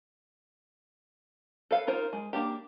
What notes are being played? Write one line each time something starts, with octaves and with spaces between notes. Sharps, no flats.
A4 B4 F5
D#4 F4 A#4 C5
G#3
A#3 D4 G4